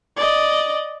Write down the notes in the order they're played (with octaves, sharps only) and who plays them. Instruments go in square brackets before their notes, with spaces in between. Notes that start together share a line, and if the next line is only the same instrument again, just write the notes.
[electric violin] D5 D#5